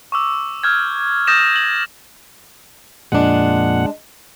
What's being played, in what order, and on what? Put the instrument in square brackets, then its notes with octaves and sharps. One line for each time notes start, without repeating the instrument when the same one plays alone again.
[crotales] C#6 D6 E6
E6 F6 G6 G#6
D#6 G6 A6 A#6 D#7 E7
F#7
[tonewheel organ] F2 A#2 F#5 [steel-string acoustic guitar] G#3 D4